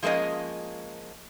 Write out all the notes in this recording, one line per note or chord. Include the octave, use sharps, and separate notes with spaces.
F3 G#3 A#3 C#4 D#5